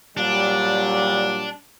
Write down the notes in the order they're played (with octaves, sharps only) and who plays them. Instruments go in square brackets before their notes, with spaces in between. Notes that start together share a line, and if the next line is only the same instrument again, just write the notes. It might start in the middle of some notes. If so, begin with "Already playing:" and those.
[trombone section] A#2 F#3 G3 [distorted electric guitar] D4